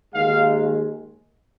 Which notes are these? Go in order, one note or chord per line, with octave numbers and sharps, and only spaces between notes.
D#2 D#3 G#3 F5